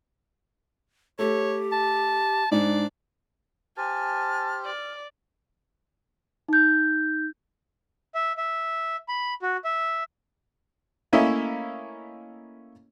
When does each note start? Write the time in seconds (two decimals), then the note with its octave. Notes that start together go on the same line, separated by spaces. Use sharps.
1.19 A3 G4 C#5
1.72 A5
2.52 G#2 D4 D5
3.77 G4 C5 G#5 A5 F6
4.65 D5
6.48 D#4 G6
8.15 E5
8.38 E5
9.08 B5
9.42 F#4
9.65 E5
11.13 A3 A#3 C#4 E4 D#5 E5